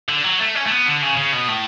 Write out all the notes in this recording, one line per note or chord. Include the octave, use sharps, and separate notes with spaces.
D3
F#3
A3
C#4
A3
B3
D3
C#3
C#3
B2
A2